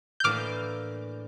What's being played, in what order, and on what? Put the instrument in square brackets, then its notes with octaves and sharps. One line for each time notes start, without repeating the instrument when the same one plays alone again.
[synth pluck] G6
[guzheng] A2 E3 A#3 D4 [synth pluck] D6 F6